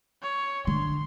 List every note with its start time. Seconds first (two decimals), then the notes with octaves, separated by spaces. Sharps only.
0.23 C#5
0.67 D3 C6